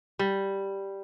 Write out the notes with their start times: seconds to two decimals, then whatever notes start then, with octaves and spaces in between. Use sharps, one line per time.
0.19 G3